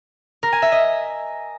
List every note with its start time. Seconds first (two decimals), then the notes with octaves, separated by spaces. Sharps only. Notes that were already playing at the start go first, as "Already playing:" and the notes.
0.43 A#4
0.53 G#5
0.62 E5
0.72 D#5